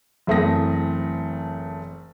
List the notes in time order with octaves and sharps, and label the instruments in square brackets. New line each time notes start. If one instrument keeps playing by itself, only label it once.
[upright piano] F#1 E3 A3 C4 D#6 A#6